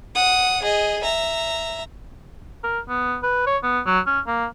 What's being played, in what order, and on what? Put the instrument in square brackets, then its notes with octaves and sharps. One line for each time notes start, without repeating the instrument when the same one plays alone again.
[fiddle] F#5 D#6
G#4 D#5
E5 A#5
[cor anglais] A#4
B3
B4
C#5
B3
F#3
C#4
A#3